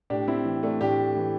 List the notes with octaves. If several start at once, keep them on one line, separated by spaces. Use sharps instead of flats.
A2 D4 G4
C4 E4
E3
A3 D4
A2 D4 G4
E3